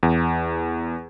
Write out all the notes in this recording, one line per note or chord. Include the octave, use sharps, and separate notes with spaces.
E2